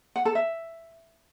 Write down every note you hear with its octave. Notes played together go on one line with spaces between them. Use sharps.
F#5
A4
E5